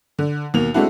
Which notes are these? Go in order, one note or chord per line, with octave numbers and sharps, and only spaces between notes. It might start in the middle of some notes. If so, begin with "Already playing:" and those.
D3
D#2 B2 A#3 F7
G#3 A3 C4 D4 E4 F#4